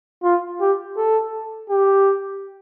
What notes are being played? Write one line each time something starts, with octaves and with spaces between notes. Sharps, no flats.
F4
G4
A4
G4